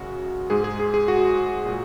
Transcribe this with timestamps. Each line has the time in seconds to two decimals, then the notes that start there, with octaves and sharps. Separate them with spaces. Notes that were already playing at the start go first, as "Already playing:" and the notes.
Already playing: F#2 C#3 G#3 F#4
0.50 G#2 G#3 G#4
0.64 G#4
0.80 G#4
0.94 G#4
1.08 F#4
1.66 A#2 G#3